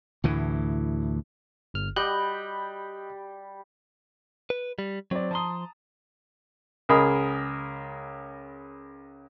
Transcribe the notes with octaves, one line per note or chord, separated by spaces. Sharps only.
D2 A2 E3
G1 F6
G3 D#5 F#6 G6
B4
G3
F#3 C4 D5
F3 A5 A#5 C6 D#6
C#2 G#4 A#4 D#5 B5